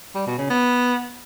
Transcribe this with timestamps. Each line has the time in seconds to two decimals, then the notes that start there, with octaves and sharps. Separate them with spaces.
0.15 G3
0.27 B2
0.38 C#3
0.50 B3